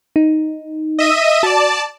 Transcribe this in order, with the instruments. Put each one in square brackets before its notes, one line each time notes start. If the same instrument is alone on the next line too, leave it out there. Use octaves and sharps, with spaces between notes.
[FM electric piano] D#4
[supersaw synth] D#5 E5 D#7
[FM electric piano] F#4 [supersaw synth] D5 A5